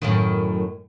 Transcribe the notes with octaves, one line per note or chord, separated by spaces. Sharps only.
F#2 A2 D#3